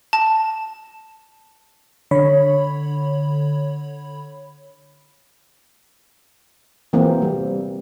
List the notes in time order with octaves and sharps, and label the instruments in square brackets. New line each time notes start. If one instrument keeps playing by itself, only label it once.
[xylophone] A5
[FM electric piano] D3 C#5 B5
[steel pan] E3 A#3 C4
G3